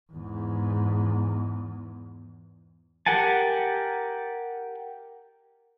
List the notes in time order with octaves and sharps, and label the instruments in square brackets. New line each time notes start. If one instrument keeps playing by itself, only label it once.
[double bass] E2 G#2
[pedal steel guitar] G4 A#4 F#5 G#5 A5